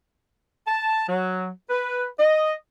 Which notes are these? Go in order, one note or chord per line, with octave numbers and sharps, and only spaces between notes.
A5
F#3
B4
D#5